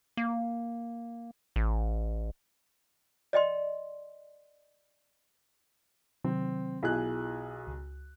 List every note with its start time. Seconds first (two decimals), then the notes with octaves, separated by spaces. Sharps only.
0.17 A#3
1.56 A1
3.33 D5 D#5 G5 C6
6.24 C3 D#3 F#3 C4
6.83 B1 E4 F4 G#4 F#6
7.67 C#2